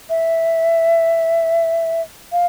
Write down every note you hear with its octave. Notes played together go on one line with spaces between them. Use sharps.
E5
F5